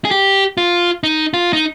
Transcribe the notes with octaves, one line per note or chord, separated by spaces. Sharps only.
G#4
G4
F4
D#4
F4
D#4